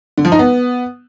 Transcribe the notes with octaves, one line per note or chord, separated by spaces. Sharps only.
D3
F3
D#4
B3